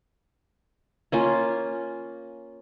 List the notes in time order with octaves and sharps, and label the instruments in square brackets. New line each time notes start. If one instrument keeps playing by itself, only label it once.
[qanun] A#3 C#4 F4